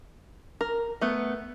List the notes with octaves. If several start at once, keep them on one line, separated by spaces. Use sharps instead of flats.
A#4
A3 B3